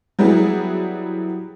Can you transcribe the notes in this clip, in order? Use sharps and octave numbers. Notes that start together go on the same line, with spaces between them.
F#3 G3 B3 E4 G#4